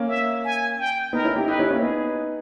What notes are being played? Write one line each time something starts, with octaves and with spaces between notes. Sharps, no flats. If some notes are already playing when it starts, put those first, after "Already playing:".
Already playing: A#3 C#4
E5
G#5
G5
B3 D#4 A#4
C#4 E4
D#4 G4
D#4 G4 B4
C#4 E4
A#3 C#4
B3 D#4 G#4